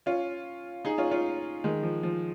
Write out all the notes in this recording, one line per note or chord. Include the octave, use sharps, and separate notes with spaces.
C#4 F4
D#4 G#4
C#4 F4
C#4 F4
D#3 G#3
F3
F3